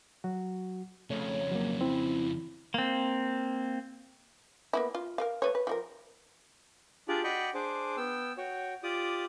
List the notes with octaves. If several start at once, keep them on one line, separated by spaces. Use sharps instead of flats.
F#3 F#4
F2 C#3 A3 C#5
F#3 A#3
C4 E4
A#3 C4
A#3 B3 E4
F4
A#4 B4 F5
A3 B4 C#5
B4
F3 F#4 A#4
D4 F4 G4 G#4 D5
F#4 D5 D#5 G5 B5 C#6
D4 G#4 C5 D6
B3 G5 E6
F#4 C#5 G5
F4 G4 D5 D6 D#6